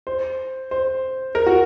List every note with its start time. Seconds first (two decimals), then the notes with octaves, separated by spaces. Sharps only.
0.07 C5
0.71 C5
1.35 A#4
1.47 F#4